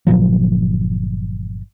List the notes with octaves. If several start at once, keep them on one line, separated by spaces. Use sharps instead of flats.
G1 A#2 F3 F#3